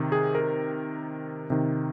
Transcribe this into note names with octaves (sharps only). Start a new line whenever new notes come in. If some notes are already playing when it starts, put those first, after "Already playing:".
Already playing: C3 D#3
G#4
A#4
C3 D#3